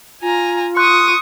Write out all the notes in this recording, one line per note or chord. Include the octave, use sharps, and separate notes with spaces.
F4 G#5 A#5
C6 C#6 D#6 F#6